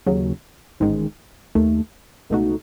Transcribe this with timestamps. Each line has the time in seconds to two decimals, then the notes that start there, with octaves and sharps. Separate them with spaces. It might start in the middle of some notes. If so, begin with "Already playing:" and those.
0.06 D#2 C#3 F#3
0.80 A1 G#2 D#3 G#3
1.55 D#2 D#3 A3
2.30 C#2 B2 A3 D#4 F#4